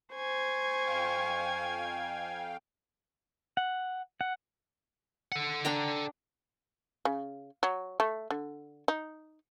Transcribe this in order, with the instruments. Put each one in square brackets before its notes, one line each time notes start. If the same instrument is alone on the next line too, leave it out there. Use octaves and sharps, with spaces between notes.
[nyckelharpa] C5 [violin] G#5 G#6 [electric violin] C#6
[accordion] F2 F5 G5
[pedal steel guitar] F#5
F#5
[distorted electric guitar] A4 F#5
[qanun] D4 G5 A#5
[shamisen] C#3
F#3
A3
D3
D#4